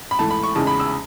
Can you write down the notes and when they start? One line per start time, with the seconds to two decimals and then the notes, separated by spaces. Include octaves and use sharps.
0.11 B5
0.19 G#2 E3 A3 A5
0.31 B5
0.43 C#6
0.55 E2 C#3 G#3 D#4 A5
0.67 B5
0.80 E6